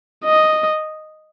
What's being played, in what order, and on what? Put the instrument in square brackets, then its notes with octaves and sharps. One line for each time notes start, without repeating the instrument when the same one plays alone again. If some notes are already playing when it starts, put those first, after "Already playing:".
[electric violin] D#5